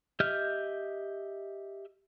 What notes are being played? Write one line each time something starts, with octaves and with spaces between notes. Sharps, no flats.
G4 D#5 E5 F6 G6